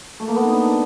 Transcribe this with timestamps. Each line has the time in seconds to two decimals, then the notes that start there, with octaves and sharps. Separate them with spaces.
0.20 A3
0.28 A#3
0.36 B3
0.44 D#4
0.52 D4